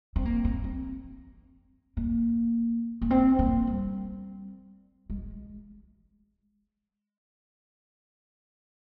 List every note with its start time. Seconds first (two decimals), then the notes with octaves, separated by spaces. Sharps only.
0.16 C4
0.25 A#3
0.45 C4
0.64 C4
1.97 A#3
3.02 A#3
3.10 C4
3.39 A#3
3.67 G3
5.10 G#3